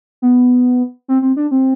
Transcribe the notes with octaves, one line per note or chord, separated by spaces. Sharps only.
B3
C4
C4
D4
C4